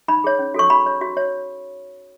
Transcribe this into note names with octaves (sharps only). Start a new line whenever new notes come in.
D#4 B5
G#4 C#5
C#4
F#4 A4 C#5 C#6
F#4 B5
C#5
F#4
C#5